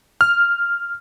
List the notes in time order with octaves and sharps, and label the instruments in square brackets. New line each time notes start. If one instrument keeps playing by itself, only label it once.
[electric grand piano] F6